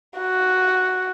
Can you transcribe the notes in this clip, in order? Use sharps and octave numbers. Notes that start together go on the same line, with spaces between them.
F#4